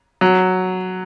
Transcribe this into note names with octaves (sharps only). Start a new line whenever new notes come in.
F#3